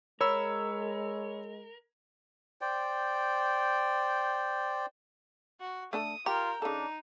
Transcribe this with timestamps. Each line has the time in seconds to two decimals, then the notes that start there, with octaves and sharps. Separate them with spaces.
0.21 G#3 A#4 C#5 B5 E6
2.61 C5 D5 G5
5.60 F#4
5.93 A3 D4 A4 D#6
6.26 F4 G4 A#4 G5 A#5
6.62 C#3 D4 D#4 A4